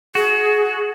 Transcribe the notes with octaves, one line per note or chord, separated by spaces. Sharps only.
F#4 G#4